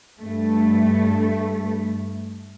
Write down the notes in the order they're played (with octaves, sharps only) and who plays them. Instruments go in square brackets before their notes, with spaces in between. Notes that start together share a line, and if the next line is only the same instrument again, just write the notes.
[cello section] G2 A3